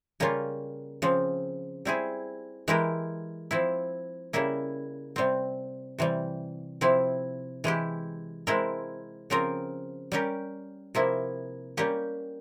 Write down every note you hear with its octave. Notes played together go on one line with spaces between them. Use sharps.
C#3 G3 A#3 C#4 F4
C#3 F3 C4
G3 C4 E4 G#4
E3 G#3 E4 G4 A#4
F3 C4 E4
C#3 G3 A#3 E4
C3 G3 C4
C3 E3 G3
C3 F3 C4 E4
E3 G#3 E4 G4
G#3 C4 E4 A#4
C#3 F3 C4 F4 A#4
G3 C#4 G4 A#4
C3 F3 A#3 E4
G3 A#3 C#4 G4